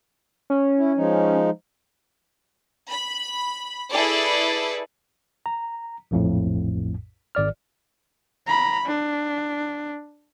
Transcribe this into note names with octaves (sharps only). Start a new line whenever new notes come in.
C#4
E4
F3 G#3 D#4
B5
E4 G#4 A4 B4 D5
A#5
A#1 F2 A2
G#1 D5 F6
A#5 B5
D4